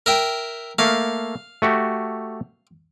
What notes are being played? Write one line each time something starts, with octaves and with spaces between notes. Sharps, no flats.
A#4 E5 G5
A3 A#3 F5
A3 F#4 G4